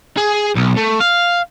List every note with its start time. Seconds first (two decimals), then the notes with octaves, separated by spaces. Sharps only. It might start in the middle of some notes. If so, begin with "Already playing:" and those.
0.17 G#4
0.55 B1
0.76 A3
1.00 F5